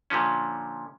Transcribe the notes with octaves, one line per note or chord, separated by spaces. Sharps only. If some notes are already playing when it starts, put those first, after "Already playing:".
A#2 D3 F3 C#4